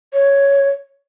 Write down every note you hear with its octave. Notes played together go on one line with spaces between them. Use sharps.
C#5